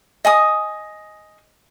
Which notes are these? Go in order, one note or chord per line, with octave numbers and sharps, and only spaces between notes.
D#5 G#5 D#6